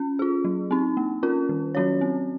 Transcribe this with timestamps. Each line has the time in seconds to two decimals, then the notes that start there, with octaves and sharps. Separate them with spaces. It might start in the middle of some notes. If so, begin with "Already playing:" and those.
Already playing: C#4
0.19 F4 G#4
0.45 F#3
0.71 C4 D#4
0.97 A#3
1.23 C#4 F4 A#4
1.49 D#3
1.75 F#3 C#4 F#4 C#5
2.01 C4